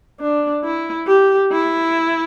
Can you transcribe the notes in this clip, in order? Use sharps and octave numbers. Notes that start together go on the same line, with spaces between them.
D4
E4
G4
E4